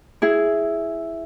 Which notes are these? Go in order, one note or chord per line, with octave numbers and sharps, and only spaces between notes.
E4 G#4